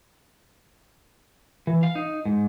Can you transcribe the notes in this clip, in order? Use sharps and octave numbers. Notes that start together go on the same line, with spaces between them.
E3
F5
D#4
G#2